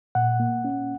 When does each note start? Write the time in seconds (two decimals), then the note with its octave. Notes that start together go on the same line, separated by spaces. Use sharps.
0.15 A#2 F#5
0.40 A#3
0.65 C#4